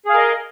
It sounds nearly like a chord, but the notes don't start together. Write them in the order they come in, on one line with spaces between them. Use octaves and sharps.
G#4 F5 A#4 D#5